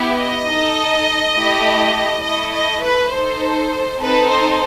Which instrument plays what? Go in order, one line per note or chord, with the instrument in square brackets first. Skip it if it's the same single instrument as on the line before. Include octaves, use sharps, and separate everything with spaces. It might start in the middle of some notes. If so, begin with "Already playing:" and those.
Already playing: [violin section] B3 E4 G4
D#5
D#4 A4
A3 E4 G4
A3 E4 A4 D#5
D#5
B4
D#4 A4 C5
C4 D#4 A4 B4
C5